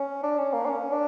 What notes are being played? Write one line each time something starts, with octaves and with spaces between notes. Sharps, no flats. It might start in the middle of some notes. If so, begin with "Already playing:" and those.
Already playing: C#4
D4
C#4
A#3
D4
C#4
D4